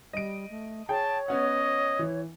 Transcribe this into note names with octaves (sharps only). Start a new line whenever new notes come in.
G3 D#5 D7
A3
G#4 C#5 G5 A5
B3 C#4 D#5 F#5
E3